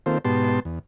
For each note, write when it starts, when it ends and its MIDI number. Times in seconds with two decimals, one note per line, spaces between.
0.06 0.18 51
0.06 0.18 58
0.06 0.18 60
0.06 0.18 65
0.06 0.18 69
0.06 0.18 72
0.25 0.60 44
0.25 0.60 47
0.25 0.60 59
0.25 0.60 67
0.25 0.60 81
0.25 0.60 84
0.65 0.79 40